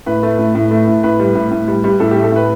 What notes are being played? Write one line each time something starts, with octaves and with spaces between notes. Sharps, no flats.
A2 B4
A3
A2
A2
A3
A2
A2 B4
G3
A2
A2
G3
G3
A2 A4
A3 G4
A4
A2 B4